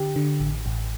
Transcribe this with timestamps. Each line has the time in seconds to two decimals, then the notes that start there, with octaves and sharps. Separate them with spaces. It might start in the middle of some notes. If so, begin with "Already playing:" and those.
Already playing: D3 G4
0.16 D3
0.40 A1
0.66 A1